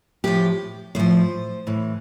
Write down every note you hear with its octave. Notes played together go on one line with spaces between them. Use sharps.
A2 F3 G4
A2 F3 C5
A2 E3